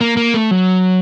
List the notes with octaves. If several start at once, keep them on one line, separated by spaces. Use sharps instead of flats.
A#3
A#3
A3
F#3